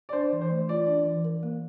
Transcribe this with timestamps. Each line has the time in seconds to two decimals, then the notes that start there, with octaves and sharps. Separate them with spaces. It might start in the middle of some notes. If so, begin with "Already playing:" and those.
0.09 D5
0.13 D4 C5
0.32 E3
0.41 C5
0.51 A3
0.69 F4 D5
0.87 D4
1.05 E3
1.24 A#4
1.43 A#3